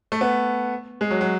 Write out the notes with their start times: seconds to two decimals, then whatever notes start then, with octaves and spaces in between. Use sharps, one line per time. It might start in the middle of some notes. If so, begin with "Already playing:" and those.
0.12 A3
0.21 B3
1.01 G#3
1.10 F#3
1.21 F#3